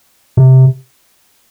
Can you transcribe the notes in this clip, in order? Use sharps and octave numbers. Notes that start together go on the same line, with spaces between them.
C3